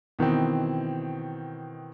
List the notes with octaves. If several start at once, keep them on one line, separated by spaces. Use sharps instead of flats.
B2 D#3 E3 C4